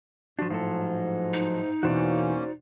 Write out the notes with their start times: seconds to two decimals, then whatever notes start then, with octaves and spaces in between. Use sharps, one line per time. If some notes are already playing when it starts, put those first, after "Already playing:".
0.39 G#2 F3 D4 F#4
0.50 A2 F3 F#3 A4
1.33 D#4
1.83 E2 B2 E3 A#3 C#4 F#4 C5 D5